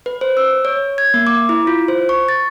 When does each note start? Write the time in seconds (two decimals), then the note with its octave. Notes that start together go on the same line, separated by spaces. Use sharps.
0.06 B4
0.21 C5
0.37 E6
0.65 C#5
0.98 G#6
1.14 A#3
1.27 D6
1.49 E4
1.67 F4
1.88 C5
2.09 C#6
2.29 A6